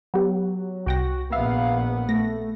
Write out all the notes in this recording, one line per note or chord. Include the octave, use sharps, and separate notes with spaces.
F#3 B3 G4
C2 F#4 G5 A#6
A#1 B3 E5 F5
A3 A#6